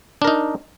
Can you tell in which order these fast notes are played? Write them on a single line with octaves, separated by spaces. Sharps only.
D4 A#4 D#4